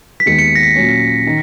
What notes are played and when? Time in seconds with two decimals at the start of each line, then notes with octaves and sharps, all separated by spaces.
0.20 B6
0.26 D#2 D#3 G#3 B3 C#7
0.39 C#7
0.55 A#6
0.63 B6
0.76 A#2 F#3 C#4
1.27 D#3